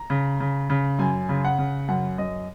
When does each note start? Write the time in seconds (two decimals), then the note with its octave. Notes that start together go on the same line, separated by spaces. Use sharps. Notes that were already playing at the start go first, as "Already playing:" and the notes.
Already playing: A#5
0.10 C#3
0.40 C#3
0.70 C#3
0.99 F#2 G#5
1.29 C#3
1.45 F#5
1.58 C#3
1.88 F#2 F#5
2.18 F#2 D#5